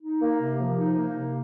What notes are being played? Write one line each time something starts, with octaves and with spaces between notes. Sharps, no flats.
D#4
A#3
C3
F3
D#4
A#3
C3